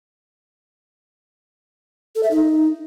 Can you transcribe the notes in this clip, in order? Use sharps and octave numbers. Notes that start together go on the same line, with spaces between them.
A4
E5
D#4